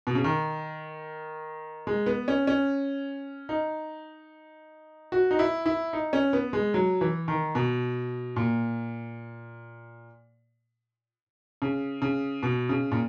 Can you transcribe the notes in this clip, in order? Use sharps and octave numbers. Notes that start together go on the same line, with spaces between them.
B2
C#3
D#3
G#3
B3
C#4
C#4
D#4
F#4
D#4
E4
E4
D#4
C#4
B3
G#3
F#3
E3
D#3
B2
A#2
C#3
C#3
B2
C#3
A#2